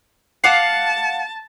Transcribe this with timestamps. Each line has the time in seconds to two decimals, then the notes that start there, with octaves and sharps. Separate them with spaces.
0.44 F5 F#5 A5 D6